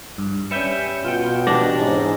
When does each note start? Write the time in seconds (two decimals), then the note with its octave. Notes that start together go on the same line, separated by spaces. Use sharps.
0.18 G2
0.51 G3 C#4 B4 E5 G6 C#7
1.05 B2 F4 G5
1.47 E3 D4 G4 A#6
1.79 G#2 C#4 D#4